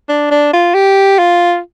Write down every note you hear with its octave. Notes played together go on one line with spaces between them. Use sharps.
D4
D4
F4
G4
F4